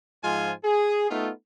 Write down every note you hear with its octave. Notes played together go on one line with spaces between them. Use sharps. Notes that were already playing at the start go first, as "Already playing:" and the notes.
G#2 F3 G#3 F4 G#5
G#4
A3 B3 D#4 F4